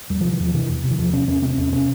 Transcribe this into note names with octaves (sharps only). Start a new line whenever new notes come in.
E2 G3
C3 F3
E3
E2 F3
C3 E3
E2
C3
E3
E2 F3
C3 C#4
E2 C#4
C3 C4
E2 C#4
C3 C#4